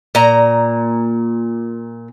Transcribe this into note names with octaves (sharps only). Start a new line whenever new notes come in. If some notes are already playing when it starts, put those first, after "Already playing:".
A#2 A#5